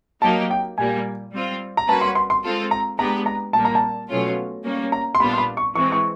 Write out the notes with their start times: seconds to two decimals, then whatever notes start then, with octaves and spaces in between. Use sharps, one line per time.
0.22 F#3 A#3 D#4 G4 A5
0.51 G5
0.78 A#2 G3 A#3 G#5
1.33 G3 C4 F4
1.77 A#5
1.88 G3 A#3 C#4 F#4 B4 A5
2.01 C6
2.15 C6
2.30 C6
2.44 G#3 C4 F4 A4
2.71 A#5
2.98 G#3 B3 D4 G4 B4 A#5
3.26 A#5
3.53 A#2 G3 A#3 A5
3.65 A#5
3.75 A5
4.09 B2 F#3 A3 C#4 F4
4.64 G3 A#3 C#4
4.92 A#5
5.15 C6
5.19 A#2 G3 B3 D4 F4 B5
5.33 C6
5.38 B5
5.57 C#6
5.75 E3 G#3 C4 C#6
5.92 C#6